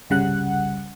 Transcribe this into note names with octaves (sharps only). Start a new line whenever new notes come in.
G1 C2 C#3 G3 F#5 F#6